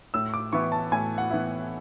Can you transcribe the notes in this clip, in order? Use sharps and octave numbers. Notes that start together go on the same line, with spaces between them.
A2 E6
D6
E3 B3 E4 C#6
A5
A2 G#5
F#5
E3 B3 E4